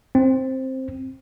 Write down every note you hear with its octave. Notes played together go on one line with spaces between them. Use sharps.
C4